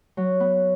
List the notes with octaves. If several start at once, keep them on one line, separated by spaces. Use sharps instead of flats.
F#3
B3